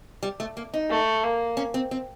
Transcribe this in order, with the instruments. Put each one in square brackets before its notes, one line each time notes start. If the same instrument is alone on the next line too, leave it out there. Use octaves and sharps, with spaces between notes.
[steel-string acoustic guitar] G3
A3
A#3
D#4
[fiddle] A3
A#3
[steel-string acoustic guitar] C#4
C4
C4